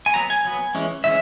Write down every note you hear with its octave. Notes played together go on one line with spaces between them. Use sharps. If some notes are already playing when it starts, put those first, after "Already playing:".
G#5
F#3 B3 A#5
G#5
F#3 B3
E3 G#3 C#4
E3 G#3 C#4 E5